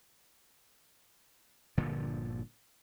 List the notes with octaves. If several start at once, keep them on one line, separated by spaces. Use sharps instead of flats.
G1 A#2 D3 F3